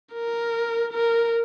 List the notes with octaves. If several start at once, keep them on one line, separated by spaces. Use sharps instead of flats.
A#4
A#4